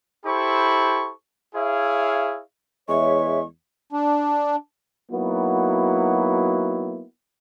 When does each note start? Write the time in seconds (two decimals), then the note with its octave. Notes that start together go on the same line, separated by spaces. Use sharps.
0.25 E4 G4 A4 C5 B5 C#6
1.55 E4 G#4 C#5 E5 F5
2.89 E2 G#3 C#5 E5 C#6
3.93 D4
5.11 F#3 A#3 B3 D#4 E4 F#4